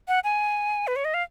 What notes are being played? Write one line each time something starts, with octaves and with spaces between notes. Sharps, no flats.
F#5
G#5
B4
C#5
D#5
F5